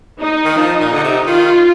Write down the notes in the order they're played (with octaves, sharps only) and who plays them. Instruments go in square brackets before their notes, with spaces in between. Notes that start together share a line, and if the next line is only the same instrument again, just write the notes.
[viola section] D#4
[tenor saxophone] D#3
[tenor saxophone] F3 [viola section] D#4
[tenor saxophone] A#2
D3
C3
[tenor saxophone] D#3 [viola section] F4